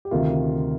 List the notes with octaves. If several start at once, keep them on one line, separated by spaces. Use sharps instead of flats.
G4
D2 C3 D#3 F4